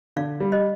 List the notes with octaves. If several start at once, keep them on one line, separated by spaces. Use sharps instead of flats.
D3 D5 F5
G3
C5 D#5